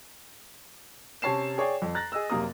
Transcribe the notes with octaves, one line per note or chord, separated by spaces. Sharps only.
C3 C#4 C#5 A5 C7 E7
G#4 C#5 D5 G5
F2
A#5 F#6 A6 A#6
G#4 D#5 E6
F#1 C3 A#3 A#5 D#6